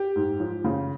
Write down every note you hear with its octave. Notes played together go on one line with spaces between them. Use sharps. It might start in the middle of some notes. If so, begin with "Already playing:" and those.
Already playing: G4
G#2
F3
C#3